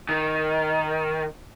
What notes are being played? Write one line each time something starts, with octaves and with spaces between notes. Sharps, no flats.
D#3